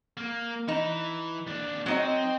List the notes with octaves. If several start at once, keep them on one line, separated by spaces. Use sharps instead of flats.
A#3
E3 D#4
D#2 D4
F#3 C4 D#4 C5 D#5